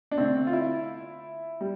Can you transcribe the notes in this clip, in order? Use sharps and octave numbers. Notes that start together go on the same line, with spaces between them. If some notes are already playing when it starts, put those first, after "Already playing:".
D4
D3 A3 C4
F4
E4
G3